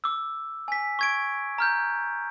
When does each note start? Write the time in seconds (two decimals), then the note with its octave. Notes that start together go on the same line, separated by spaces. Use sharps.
0.04 D6 E6
0.68 G#5 B6
0.99 C#6 G#6 D7
1.58 A#5 F6 G6